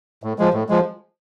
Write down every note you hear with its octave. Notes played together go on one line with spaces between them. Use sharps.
A2
F3 G#3
A2
F3 G#3